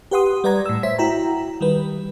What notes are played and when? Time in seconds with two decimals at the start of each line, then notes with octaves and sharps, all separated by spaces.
0.11 G4 B4 F#5 C6 D#6
0.44 G3 B4 D5 F#5 A#5 G#6
0.66 A2 E6
0.83 C5 C#5 E5 B6
0.98 E4 F#4 G5 A#5
1.61 D#3 G3 B4